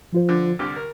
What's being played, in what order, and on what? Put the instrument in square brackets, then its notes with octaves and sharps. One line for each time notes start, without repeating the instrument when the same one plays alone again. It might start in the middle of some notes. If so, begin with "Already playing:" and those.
[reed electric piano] F3 F4 C5
[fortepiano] D3
[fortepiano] C2 D3 G4 [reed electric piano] F6
[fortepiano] A#4